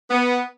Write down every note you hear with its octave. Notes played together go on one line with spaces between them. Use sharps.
B3